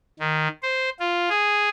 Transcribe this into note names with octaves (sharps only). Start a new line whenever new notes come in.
D#3
C5
F4
G#4